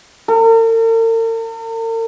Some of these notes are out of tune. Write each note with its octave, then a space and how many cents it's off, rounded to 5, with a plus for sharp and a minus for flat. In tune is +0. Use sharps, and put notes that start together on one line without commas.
A#4 -45